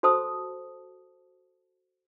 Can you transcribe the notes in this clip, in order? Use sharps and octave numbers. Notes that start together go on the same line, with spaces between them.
F#4 A4 C5 A5 D#6 E6